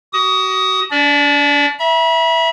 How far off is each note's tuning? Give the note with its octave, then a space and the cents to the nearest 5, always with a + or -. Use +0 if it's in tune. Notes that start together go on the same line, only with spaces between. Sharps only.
F#4 +35 D#6 +10
D4 -40 D5 +0
E5 +0 B5 -45